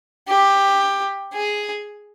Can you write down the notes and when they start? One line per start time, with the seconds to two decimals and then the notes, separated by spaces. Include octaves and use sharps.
0.28 G4
1.34 G#4